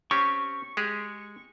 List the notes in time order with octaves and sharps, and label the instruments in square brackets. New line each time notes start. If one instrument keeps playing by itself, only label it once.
[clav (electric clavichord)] C4 C#4 G4 [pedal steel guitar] C#6
[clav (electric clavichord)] G#3 G4 G#4